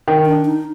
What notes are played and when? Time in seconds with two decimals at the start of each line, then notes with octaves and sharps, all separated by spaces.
0.08 D#3
0.26 D4
0.45 D#4